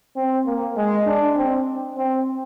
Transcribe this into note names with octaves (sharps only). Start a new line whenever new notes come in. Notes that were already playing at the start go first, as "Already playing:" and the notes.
C4
A#3
G#3
D4
C4
C4